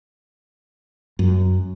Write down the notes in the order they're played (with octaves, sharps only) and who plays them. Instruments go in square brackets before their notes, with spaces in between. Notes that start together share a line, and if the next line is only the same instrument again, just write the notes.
[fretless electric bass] F#2